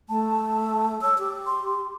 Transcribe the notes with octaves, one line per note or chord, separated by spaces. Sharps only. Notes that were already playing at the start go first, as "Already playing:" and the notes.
A3 A5
C#5 E6
G4
C6